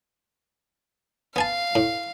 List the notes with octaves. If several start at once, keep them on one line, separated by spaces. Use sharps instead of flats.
B3 F5 G#5 A5
A2